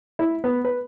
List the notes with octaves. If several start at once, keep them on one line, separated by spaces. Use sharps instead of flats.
E4
B3
B4